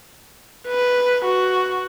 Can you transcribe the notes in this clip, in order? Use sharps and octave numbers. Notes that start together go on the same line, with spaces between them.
B4
F#4